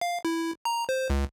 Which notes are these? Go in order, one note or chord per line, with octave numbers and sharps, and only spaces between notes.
F5
E4
A#5
C5
C#2